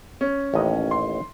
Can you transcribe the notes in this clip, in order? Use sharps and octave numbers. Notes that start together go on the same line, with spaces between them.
C#4
A1 D#2 D#5
C6